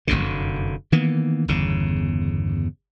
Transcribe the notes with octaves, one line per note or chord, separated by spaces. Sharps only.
F1 B1 F#2 D3
D#3 E3 A#3 B3
G1 E2 C#3